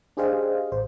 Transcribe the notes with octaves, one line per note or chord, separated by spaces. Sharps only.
D4 G4 G#4 C5 D#5 F5
A1 C5